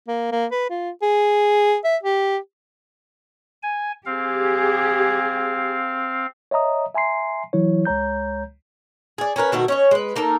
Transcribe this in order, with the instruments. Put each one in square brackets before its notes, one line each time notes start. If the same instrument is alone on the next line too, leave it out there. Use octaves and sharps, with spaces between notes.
[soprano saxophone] A#3
A#3
B4
F4
G#4
E5
G4
[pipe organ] G#5
[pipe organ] C4 F5 [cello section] G4 G#4
[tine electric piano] C#5 D#5 E5 A#5 D#6
E5 G#5 A#5 C6 C7
E3 F#3 E4 C#5
C#2 G#3 C#5 A#5 G6
[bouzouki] G#4 D5
C#4 D4 A#4 B4
B2 D#3 A3 F#4
C#4 C#5 D#5
G#3 B4
A#3 D#4 A4 A#4